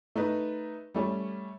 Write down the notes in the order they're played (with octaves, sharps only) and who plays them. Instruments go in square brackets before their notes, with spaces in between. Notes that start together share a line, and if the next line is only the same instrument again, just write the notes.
[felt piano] A3 D#4 B4
G3 A3 C#4